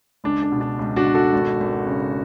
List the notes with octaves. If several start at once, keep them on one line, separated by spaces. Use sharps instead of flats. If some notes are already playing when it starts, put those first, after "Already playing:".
C#2 D4
D4
B2
D4
C#2
D4 F#4
B2
F#4 A4
G#1
G#1
C#3